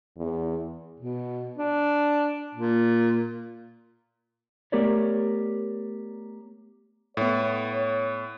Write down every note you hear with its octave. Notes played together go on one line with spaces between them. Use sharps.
E2
B2
D4
A#2
A3 B3 G4 A#4 C#5 D5
A2 B3 C#5